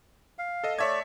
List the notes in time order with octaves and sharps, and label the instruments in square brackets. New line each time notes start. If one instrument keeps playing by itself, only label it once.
[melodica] F5
[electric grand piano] A4 D#5
[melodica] A3 D5 [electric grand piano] C#5 E5 G#6